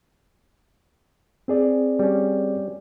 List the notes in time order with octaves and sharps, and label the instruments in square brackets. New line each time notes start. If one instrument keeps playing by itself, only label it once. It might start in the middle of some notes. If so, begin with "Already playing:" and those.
[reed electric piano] C4 G#4 D5
[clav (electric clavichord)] G3 C#4